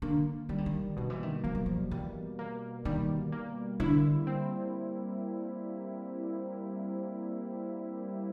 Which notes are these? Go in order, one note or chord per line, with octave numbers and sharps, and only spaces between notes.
D3 A#3
D#3 G3
D3
D#3
B2 D#3
E3
D#3
F3 A#3
F#3
F3
E3 G3
A#3
D#3 G3
A#3
D3 E4
C4